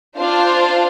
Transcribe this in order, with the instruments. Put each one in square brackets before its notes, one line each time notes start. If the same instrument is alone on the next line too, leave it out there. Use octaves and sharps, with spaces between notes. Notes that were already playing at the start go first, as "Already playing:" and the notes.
[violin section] D4 F4 C5 F5